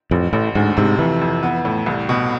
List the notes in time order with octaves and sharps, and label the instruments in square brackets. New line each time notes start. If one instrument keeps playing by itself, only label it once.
[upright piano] A1 [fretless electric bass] F2
[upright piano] A1 [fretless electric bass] A2
[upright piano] D2 [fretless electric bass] G#2
[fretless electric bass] G#2 [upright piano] C3
[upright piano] F2 [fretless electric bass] E3
[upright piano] F2
B3
A2
C2
B2